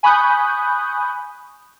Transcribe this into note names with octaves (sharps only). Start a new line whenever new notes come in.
G#5 B5 C#6 D#6 F#6 G6